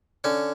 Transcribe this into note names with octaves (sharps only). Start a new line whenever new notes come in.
D3 C#4